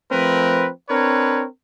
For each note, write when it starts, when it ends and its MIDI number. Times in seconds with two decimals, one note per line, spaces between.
0.12 0.70 53
0.12 0.70 57
0.12 0.70 60
0.12 0.70 70
0.12 0.70 71
0.90 1.45 60
0.90 1.45 62
0.90 1.45 70
0.90 1.45 71
0.90 1.45 73